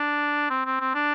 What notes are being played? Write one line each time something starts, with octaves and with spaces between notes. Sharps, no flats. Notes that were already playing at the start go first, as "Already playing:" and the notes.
Already playing: D4
C4
C4
C4
D4